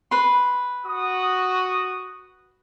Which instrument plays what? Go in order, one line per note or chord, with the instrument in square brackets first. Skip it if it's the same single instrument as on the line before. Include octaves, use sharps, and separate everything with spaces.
[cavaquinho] B4 C6
[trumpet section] F#4 D#6